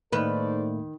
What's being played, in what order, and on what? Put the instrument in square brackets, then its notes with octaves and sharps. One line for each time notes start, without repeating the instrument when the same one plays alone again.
[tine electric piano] A2 A3 A#3 [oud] D#3 B4 [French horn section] A4 C5 D5